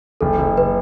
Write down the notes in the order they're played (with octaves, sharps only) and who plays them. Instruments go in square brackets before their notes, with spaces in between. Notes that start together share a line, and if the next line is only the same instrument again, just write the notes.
[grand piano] F#1 [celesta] A4
[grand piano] F#1
[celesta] B4